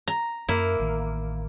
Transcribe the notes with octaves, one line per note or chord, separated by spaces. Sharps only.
A#5
F#2 A#3 E4
A1 D#3